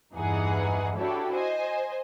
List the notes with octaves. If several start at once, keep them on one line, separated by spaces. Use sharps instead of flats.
E2 G2 E3 D#4 G#4 F#5
D4 E4 F#4 G4 A4 C#5
C5 D#5 G#5